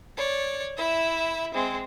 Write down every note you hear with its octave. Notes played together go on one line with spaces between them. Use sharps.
C#5 D5
E4 E5
G#3 C4